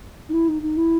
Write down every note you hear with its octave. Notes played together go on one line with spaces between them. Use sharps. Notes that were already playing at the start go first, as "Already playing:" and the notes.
D#4
E4
D#4
D#4
E4